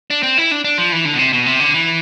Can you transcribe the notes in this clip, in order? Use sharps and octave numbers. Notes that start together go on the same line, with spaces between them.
D4
C4
E4
D4
D4
F3
E3
D3
B2
C3
B2
C3
D3
E3